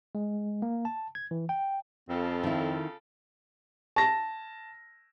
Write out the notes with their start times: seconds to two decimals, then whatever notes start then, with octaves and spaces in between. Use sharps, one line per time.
0.15 G#3
0.62 A#3
0.85 A5
1.15 G#6
1.31 E3
1.49 G5
2.09 F2 C#3 C4 F4 A4
2.43 D#3 E4
3.96 A5 A#6